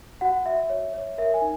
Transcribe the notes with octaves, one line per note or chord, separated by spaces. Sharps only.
F#4 F#5
F#4 E5
C#5
C#5
A#4 E5
G#5
D#4